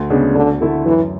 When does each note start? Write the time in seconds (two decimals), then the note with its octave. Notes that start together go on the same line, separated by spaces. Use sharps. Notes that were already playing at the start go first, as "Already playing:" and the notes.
Already playing: D2
0.10 C#3 G#3 B3 D4
0.35 D2 D3
0.61 D3 A3 E4 A4
0.86 F#2 E3